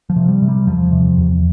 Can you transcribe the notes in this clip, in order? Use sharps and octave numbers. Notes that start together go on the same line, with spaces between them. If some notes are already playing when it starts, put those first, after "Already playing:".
F3
C3
G3
C3
G3
E2 F3
C3
E2